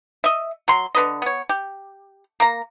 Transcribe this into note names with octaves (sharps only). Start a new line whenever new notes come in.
D#5 E5
F#3 C6
D3 B4 D#5
B3 C#5
G4
A#3 A#5